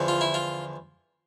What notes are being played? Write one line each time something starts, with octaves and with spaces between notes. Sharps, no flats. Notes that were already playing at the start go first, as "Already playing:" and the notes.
Already playing: E2 D3 F3
F4
E4
F4